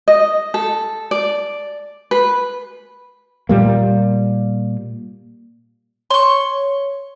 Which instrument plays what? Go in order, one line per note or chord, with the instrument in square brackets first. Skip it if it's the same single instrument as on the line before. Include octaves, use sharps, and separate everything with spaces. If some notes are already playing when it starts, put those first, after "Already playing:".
[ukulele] D#5
A4
D5
B4
[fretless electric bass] A#2 G3 A#3
[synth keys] C#5 [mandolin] C6 C#6